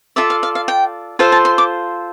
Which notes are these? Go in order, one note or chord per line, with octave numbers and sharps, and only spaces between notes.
F4 A4 D5 E5
F5
F5
F5
G5
F4 A4 C5 F5
A5
C6
D6